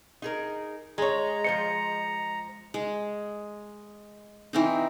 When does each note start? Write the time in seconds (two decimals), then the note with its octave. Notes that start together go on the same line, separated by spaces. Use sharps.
0.22 D#4 G#4 A#4
0.98 G#3 G#4 C#5 A#5
1.44 F3 C5 D#5 C#7
2.74 G#3
4.53 E3 C4 D#4